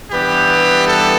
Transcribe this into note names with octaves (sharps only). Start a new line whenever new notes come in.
G2 E3 G3 B3 G4
A4